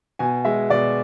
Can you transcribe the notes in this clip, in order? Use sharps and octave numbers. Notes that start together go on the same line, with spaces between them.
B2 G#5
G#3 E5
B2 D5